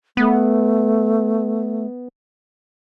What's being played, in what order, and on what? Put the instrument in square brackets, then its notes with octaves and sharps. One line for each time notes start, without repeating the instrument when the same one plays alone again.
[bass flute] A3 [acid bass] B3